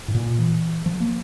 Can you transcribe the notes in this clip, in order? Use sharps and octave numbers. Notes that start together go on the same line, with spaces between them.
A2
A#2
E3
F3
A#3